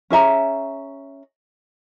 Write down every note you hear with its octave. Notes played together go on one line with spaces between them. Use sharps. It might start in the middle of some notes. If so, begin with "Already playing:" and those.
C#4 G#4 E5 A#5